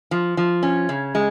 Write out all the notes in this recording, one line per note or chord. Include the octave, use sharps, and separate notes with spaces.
F3
F3
C#4
C#3
G#3